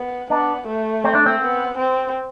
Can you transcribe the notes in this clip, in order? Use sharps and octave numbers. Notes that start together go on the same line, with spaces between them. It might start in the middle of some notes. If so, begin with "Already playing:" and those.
Already playing: B3
B3 D4
A3
C4
D4
C4
B3
C4